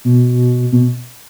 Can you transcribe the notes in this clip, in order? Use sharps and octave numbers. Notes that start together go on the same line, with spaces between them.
B2
B2